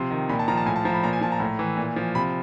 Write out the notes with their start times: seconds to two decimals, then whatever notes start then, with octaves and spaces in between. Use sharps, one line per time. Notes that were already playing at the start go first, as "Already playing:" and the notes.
Already playing: C3 F3 C6
0.11 D#3
0.29 A#2 B5
0.39 A5
0.48 F3 A#5
0.57 A5
0.66 A2 G#5
0.76 A5
0.85 F3 A#5
0.94 B5
1.03 A#2 A#5
1.13 G#5
1.21 F3 A5
1.32 A#5
1.40 A2
1.59 E3
1.77 A#2
1.96 F3
2.15 C3 B5